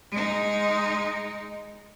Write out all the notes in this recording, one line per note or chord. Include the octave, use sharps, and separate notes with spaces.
G#3 D#4